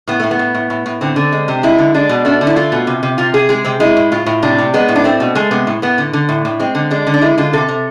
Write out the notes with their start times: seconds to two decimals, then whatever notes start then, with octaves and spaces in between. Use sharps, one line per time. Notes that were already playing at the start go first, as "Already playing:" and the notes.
0.08 A2 B3
0.20 A2 A3
0.31 B3
0.39 A2
0.54 A2
0.70 A2
0.86 A2
1.01 D3 C4
1.16 D3
1.32 G#3
1.48 C3
1.63 G#3 E4
1.78 D3
1.94 G#3 D4
2.09 B2
2.25 A3 D4
2.41 D3
2.47 E4
2.56 A3 F4
2.72 B2
2.87 C3
3.03 C3
3.18 C3 F4
3.34 C3 G#4
3.49 G#3 G#4
3.65 C3 C4
3.80 G#3 E4
3.97 A2
4.12 A2 F4
4.26 A2
4.42 C3 D4
4.58 C3
4.74 G#3 B3
4.89 A2
4.96 D4
5.04 A3 C4
5.20 B2
5.35 G#3 A3
5.51 C3 B3
5.67 A2
5.82 A2 B3
5.98 D3
6.13 D3
6.29 A2
6.45 A2
6.60 G#3 C4
6.75 D3
6.91 G#3 D4
7.07 D3
7.14 D4
7.21 G#3 E4
7.38 D3 F4
7.53 C3 A4
7.68 C3